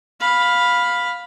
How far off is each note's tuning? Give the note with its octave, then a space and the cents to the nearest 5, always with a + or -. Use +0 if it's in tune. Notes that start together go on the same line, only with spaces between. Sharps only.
F5 +15 B5 +0